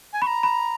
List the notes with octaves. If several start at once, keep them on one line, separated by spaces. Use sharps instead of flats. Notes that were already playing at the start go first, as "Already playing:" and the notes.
G#5
A#5 B5 C#6
B5